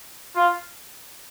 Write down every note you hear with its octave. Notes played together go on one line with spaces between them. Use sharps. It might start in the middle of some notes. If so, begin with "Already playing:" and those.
F4